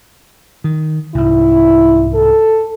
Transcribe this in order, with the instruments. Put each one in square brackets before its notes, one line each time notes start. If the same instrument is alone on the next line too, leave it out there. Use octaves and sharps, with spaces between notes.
[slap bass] D#3
[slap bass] C2 G#2 [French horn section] E4
[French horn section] A4